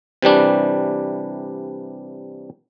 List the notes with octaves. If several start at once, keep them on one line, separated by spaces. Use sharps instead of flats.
C3 E3 G3 D4